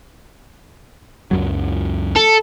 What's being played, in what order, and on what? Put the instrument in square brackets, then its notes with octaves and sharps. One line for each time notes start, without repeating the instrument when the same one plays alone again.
[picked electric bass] C#2 F#2 F#3
[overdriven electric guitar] A4